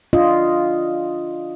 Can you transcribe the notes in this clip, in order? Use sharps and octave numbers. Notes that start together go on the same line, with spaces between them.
D4 F4 D#5